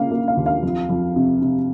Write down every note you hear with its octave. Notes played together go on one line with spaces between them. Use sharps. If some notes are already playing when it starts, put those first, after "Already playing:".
Already playing: C#3 A#3 F5
A#3
F5
D#2
F5
F2
F2
C3
C3